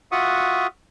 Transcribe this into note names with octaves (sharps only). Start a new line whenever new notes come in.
F4 F#4 E5 F#5 C#6 D#6